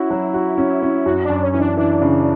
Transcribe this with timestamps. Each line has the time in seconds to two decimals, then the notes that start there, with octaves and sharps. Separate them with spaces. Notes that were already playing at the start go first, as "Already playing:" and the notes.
Already playing: C#4 E4 F#4
0.10 F#3
0.34 F#4
0.58 C#4
0.82 C#4
1.06 F#2 F#4
1.24 D4
1.30 F#2
1.42 C#4
1.52 E3 C#4
1.59 D4
1.77 E3 D4
2.02 C#3